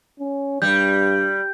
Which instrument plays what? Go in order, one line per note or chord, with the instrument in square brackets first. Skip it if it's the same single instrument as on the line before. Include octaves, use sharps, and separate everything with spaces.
[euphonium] C#4
[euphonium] G2 [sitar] G3 [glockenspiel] G6